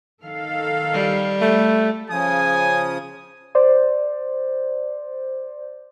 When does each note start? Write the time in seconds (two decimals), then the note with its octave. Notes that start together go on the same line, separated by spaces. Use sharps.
0.23 D#3 A4 F5
0.93 G3
1.41 A3
2.10 C#3 F3 G#5 D#6
3.55 C5 D5